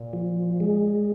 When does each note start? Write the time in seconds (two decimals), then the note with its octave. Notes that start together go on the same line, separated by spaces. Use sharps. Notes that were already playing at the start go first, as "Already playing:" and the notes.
Already playing: A#2
0.13 F3
0.60 G#3